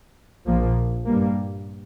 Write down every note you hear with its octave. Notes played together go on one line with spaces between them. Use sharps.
A#1 A#2 F3 A#3
G2 G3 A#3